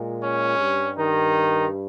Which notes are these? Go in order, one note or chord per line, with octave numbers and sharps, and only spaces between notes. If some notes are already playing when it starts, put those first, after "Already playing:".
Already playing: A#2 G#3
C#4
G2 G3
D#3 D#4